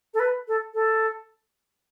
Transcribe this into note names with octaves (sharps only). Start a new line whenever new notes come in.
A4
B4
A4
A4